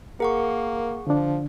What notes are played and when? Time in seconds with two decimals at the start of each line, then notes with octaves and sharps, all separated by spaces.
0.20 A#3 G#4 A#4 F#5 C#6
1.07 D3 F3 D4